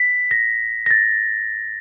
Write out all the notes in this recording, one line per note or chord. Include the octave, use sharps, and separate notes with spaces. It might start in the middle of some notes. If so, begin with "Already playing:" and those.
Already playing: B6
A#6
A#6
A6